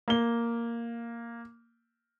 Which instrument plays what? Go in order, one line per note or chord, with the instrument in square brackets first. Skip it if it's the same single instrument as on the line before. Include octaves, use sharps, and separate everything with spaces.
[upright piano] A#3 G7